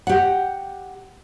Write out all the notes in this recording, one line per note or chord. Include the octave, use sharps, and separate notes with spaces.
G4 F#5